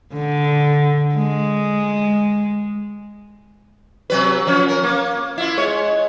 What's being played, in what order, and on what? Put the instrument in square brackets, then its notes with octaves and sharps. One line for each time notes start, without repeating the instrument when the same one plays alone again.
[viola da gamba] D3
G#3
[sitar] C3 F#3 B4
F3 C#4
A#4
A#3
E4 F4
G#3 C#5